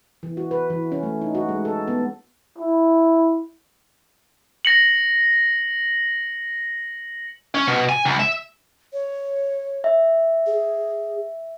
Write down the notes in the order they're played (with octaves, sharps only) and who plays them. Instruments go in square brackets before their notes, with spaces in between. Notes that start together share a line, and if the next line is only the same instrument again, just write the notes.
[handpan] E3
F#4
B4
E3
C#4
A3
D#4
F#4
G#3
A4
B3
[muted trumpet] E4
[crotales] A#6 C#7 F#7
[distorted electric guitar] C#4
B2
G#5
C#2
E5
[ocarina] C#5
[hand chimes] E5
[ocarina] G#4